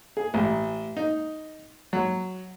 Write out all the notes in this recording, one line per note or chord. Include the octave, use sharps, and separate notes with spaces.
G#4
A1
D#4
F#3